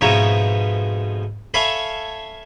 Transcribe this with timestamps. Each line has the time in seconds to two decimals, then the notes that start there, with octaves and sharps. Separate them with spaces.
0.01 F2 G#2 B2 C#5 E5 A#5
1.54 A4 C#5 E5 F5 G#5 B5